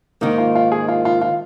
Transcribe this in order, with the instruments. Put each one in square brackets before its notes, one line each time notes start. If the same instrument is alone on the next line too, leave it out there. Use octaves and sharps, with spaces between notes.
[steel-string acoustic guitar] G#2 D#3 A#3 [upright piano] D#4
[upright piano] F4
F4
G#4
F4
F4
F4